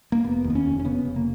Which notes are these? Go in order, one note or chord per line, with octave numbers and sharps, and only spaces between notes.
A#3
F1 B3
D#2
B3
C#4
F1
C#4
C#3 B3
F1
A#3